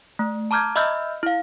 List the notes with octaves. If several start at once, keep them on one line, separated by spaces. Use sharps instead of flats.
A3
A5 A#5 D6 F6 G6 G#6
D#5 E5 B5 E6 F6 G6
E4 F5